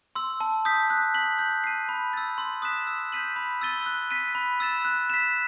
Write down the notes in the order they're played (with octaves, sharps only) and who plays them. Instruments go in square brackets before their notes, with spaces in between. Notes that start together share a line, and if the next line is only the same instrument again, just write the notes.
[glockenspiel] C6 E6
A5
D#6 G6 B6
F#6
B6 F#7
G6
C7 D#7
B5
E6 A6
C6
D#6 F#6 B6 E7
E6
G6 B6 D#7 F#7
B5
E6 A6 D#7 G7
F#6
B6 D#7
B5
E6 A6 E7
F#6
B6 E7